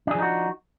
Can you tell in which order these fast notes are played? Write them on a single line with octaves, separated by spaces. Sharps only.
D4 G#4 F3 D#4 F#4